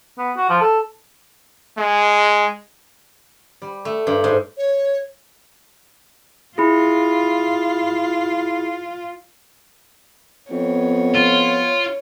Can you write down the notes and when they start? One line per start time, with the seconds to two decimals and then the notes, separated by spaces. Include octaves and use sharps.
0.18 B3
0.37 F#4
0.49 F3
0.61 A4
1.78 G#3
3.62 G3
3.85 A3
4.07 G2
4.24 G#2
4.57 C#5
6.58 E4 F4 G#4
10.51 F2 B3 C#5
11.14 F4